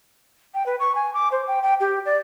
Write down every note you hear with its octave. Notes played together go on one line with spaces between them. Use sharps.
G5
B4
C#6
G#5
D6
C5
G5
G5
G4
D5